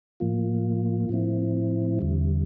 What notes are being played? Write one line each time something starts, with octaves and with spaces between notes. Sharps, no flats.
A2 F3 A#3 F4
A2 F3 C4 E4
E2 D3 G3